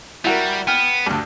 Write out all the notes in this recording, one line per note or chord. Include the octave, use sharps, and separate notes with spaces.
G3 E4 F#4 A#4
B3 G5 F6
D2 G2